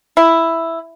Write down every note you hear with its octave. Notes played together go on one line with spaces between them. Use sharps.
E4